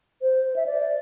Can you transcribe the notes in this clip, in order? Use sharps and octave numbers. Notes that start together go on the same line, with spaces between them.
C5
E5
D5